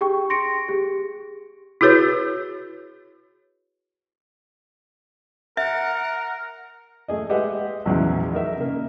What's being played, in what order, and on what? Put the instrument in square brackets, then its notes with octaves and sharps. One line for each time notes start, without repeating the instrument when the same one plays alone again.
[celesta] G4 G#4 G5 C#6
C6 A#6 C#7 D7
G4 G#4
[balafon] E4 F#4 G#4 B4 C#5
[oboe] A#4 [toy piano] E5 [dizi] F#5
[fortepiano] A3 G#4 D#5
G#3 G4 B4 D#5 E5 F#5
A#1 E2 C#3 F#3 G#3 E4
D#4 A#4 E5
C#3 A#3